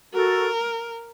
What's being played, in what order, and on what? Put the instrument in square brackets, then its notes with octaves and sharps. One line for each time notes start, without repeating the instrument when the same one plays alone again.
[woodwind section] F#4 A4 [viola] A#4